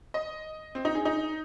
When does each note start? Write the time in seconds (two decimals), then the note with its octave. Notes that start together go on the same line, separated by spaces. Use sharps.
0.14 D#5
0.75 C4
0.85 D#4
0.95 G#4
1.05 D#4